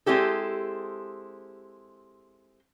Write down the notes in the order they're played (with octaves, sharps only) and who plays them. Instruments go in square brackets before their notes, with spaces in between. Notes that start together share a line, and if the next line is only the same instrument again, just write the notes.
[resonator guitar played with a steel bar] G#3 C4 E4 G4 A4